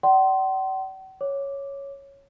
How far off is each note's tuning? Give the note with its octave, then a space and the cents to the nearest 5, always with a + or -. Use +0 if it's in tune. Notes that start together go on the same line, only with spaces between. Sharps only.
D5 +0 F#5 +45 C6 +0
C#5 +0 D6 +0